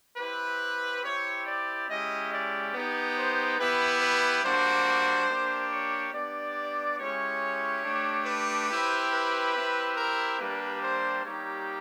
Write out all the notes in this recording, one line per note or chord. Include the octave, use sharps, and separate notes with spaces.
C4 E4 G4 B4
C4 E4 G4 C#5
D5
G#3 C#4 E4 G4 D#5
D5
B3 D#4 G4
C5
B3 E4 G4 B4
B4
G3 A#3 D4 F#4 C5
A#3 D4 G4
C#5
B3 D4 G4 D5
G#3 C#4 E4 G4 C#5
A3 D4 G4
B4
C4 E4 G4
B4
C4 E4 G4
A#4
G3 A#3 D4 G4 B4
C5
G3 A#3 D#4 G4 C#5